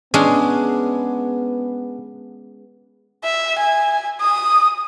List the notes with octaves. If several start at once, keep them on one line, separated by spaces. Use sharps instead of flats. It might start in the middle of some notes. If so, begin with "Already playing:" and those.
G#3 B3 C#4 D4 G#4
E5
G#5
D#6